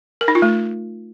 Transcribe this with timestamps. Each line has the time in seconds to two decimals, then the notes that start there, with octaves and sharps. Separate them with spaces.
0.21 A#4
0.28 D#4
0.35 F4
0.42 A3